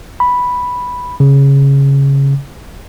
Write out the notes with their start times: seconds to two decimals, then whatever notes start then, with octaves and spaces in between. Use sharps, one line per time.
0.20 B5
1.20 C#3